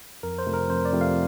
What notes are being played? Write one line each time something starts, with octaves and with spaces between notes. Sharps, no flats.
F2 A#4
C5
C3 F3 A3 C4
A#4
F2 C5
D5
C3 F3 A3 C4
F5